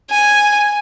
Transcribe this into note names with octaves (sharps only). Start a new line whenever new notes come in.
G#5